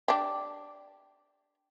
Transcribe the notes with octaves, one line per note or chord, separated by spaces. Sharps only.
D4 G4